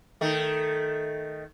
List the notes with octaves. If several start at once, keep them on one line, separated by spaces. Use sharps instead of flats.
D#3 A3